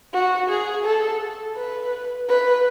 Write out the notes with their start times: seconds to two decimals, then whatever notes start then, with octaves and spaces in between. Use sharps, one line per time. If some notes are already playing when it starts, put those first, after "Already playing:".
0.13 F#4
0.49 G#4
0.85 A4
1.56 B4
2.29 B4